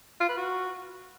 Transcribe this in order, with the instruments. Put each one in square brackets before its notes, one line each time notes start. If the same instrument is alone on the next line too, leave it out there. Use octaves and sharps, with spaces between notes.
[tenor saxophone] F4
B4
F#4